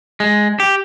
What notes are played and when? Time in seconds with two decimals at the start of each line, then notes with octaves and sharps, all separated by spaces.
0.20 G#3
0.60 G4